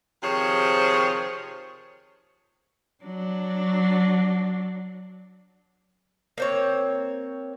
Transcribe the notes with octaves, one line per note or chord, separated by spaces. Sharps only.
C3 D#3 F3 G#4 C5 C#5
F#3 D4
A#3 C4 C#5